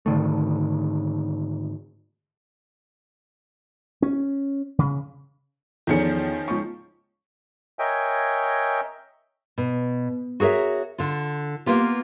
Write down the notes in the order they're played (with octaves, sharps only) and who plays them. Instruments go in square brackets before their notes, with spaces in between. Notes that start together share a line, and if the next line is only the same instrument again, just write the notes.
[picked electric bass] G#2 D3 D#3 A3
[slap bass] C#4
C#3
[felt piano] E2 A4 C#7 [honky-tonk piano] D#3 F3 C#4
[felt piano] C#2 C#6
[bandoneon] A#4 C#5 D#5 E5 G5 G#5
[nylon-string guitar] B2
F#4 G#4 A#4 C#5 E5
D3 F4
A#3 B3 F4 G4